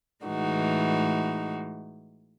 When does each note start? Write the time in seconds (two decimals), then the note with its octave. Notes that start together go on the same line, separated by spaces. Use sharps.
0.24 A2 E3 G#3 D#4 F#4